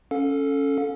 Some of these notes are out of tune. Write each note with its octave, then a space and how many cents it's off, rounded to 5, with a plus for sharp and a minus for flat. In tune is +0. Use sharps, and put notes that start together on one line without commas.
C#4 +0 A4 +0 F5 +40